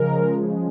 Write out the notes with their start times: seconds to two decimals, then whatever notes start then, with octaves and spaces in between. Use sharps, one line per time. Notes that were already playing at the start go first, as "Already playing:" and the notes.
Already playing: C#3 F3 G#3 A#4